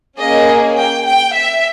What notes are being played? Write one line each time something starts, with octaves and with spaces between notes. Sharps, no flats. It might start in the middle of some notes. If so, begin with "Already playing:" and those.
A#3 C#4 G#4 D#5
G5
G5
E5